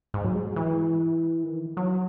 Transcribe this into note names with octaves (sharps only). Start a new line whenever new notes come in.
G#2
F#3
G#3
E3
D#3
E3
F#3